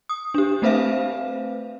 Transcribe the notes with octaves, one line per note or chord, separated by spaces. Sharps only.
D#6
D4 G4
A3 C4 B4 C5 E5 F5